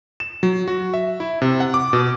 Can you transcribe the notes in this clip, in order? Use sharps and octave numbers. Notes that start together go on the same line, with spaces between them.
E7
F#3
F#4
E5
E4
C3
F#5
D6
B2